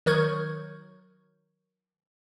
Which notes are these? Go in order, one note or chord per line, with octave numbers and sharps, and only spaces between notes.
D#3 F#3 A#4 C#6 G6 G#6